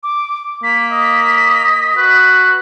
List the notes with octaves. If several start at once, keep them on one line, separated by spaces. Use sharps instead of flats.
D6
A#3 B6
D#5
F#4 B4